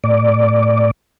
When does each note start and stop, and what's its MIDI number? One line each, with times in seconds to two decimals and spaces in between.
0.04 0.91 45
0.04 0.91 74